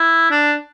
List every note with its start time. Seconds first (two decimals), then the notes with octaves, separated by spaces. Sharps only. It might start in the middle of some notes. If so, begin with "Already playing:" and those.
Already playing: E4
0.31 D4